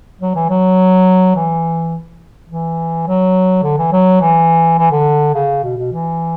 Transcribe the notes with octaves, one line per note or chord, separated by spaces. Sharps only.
F#3
E3
F#3
E3
E3
F#3
D3
E3
F#3
E3
E3
D3
C#3
B2
B2
E3